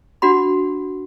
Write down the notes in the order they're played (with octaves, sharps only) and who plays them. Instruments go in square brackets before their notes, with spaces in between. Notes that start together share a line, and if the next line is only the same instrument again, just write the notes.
[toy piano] D4 F#4 F#5 B5